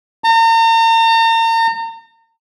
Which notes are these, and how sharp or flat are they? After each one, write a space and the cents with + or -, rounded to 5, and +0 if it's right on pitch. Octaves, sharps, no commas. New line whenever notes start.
A#5 -40